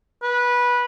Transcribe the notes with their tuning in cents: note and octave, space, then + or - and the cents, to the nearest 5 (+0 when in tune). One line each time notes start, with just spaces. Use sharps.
B4 -15